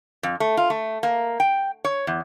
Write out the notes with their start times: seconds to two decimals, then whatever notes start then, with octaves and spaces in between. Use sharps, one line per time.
0.23 F2
0.40 A3
0.57 F4
0.70 A3
1.03 A#3
1.40 G5
1.85 C#5
2.07 E2